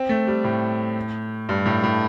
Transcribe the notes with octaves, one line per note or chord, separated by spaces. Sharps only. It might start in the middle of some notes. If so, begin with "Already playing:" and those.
Already playing: C4
A3
G3
A2
G2
A2
A2